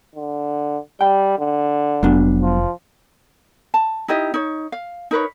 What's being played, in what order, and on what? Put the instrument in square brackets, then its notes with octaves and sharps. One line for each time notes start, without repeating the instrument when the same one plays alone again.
[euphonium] D3
[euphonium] G3 [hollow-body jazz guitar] G5
[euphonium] D3
[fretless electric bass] F1 [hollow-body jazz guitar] F#3 B3 D4
[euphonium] F3
[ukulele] A5
D#4 E4 G4 D#5
D#4 C#5
F5
D#4 A#4 B4 C#5